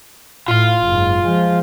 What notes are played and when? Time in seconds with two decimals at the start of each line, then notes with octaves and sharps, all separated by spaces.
0.48 A2 F4 F5
0.86 F#1 G#2
1.25 F3 G#3